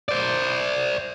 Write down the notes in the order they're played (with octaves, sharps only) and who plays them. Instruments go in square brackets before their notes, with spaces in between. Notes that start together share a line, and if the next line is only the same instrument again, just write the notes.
[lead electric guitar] C5 D5